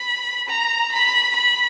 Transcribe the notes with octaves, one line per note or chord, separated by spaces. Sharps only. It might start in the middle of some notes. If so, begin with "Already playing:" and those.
Already playing: B5
A#5
B5
B5